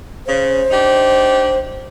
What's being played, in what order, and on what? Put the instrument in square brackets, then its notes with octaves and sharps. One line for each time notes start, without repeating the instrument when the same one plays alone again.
[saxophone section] C#3 [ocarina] C5
[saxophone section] D4 D#4 G4